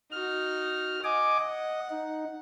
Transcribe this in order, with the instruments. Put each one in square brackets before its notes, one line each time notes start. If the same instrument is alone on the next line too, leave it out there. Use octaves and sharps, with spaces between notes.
[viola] D#4 F#4 [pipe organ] F6
[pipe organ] D#5 G#5 D6 [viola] F#5
[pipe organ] D#5
D#4